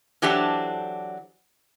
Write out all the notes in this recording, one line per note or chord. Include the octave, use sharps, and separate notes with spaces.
E3 F#3 D4 G4 A4 C5